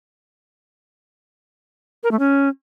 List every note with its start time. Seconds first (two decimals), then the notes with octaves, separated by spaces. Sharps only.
2.04 A#4
2.11 A3
2.19 C#4